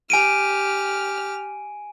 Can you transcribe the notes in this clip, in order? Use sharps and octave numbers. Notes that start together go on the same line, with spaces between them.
G4 G#5 F6 D7 D#7